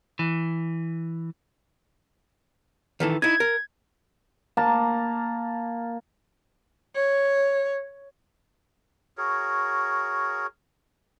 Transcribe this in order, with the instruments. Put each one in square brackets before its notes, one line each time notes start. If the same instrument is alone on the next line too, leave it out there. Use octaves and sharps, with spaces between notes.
[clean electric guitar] E3
[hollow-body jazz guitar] D#3 E3 A4
[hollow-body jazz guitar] D#4 E4 [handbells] G#6
[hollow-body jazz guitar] A#4
[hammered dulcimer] A#3 A5 A#5
[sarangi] C#5
[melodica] F#4 G#4 A#4 C#5